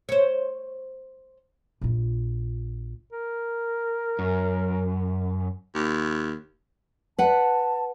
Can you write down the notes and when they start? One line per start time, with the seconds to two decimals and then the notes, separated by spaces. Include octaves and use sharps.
0.09 C5 C#5
1.82 A#1 F4
3.13 A#4
4.19 F#2
5.75 D#2
7.19 B4 F#5 A5